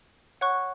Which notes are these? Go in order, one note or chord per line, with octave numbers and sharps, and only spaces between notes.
C#5 F#5 C#6 F#6